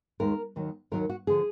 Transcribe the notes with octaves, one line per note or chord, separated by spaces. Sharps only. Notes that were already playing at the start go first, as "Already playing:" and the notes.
D#2 D#3 G#3 A#4
D#2 D#3 F#3
D#2 D#3 F#3 A#4
F#4
D3 F3 G#4